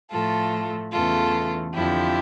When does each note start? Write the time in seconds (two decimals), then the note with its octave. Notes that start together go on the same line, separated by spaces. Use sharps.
0.11 A2 F3 A3 F4 A4
0.92 E2 C#3 E3 A3 F4 A4
1.74 F2 D3 F3 E4 G4